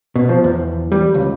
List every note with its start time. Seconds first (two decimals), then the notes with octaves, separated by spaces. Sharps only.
0.16 B2
0.29 F3
0.44 E2
0.92 G3
1.14 C#2